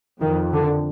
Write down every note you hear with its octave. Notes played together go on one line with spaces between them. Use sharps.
F2 D#3
D3